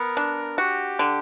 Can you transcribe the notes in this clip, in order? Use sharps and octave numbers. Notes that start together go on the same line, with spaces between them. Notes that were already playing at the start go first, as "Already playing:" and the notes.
Already playing: B3 A#4
D4
F#4 G4
D3